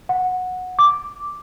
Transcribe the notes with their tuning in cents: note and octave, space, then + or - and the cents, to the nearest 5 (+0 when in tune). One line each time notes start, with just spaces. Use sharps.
F#5 -15
D6 +0